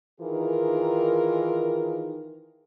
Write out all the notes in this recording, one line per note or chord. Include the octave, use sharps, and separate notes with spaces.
D#3 E3 D#4 F4 G#4 A#4